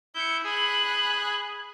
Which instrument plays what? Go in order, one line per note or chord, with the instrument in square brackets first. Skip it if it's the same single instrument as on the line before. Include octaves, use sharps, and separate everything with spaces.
[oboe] E4 [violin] G6 C#7
[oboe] G#4 [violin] B5 F#6